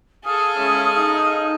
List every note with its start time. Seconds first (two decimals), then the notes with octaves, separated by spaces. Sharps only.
0.25 G#4 A4 F5 D#6 F6
0.57 G#3 C#4 E4
0.97 D#4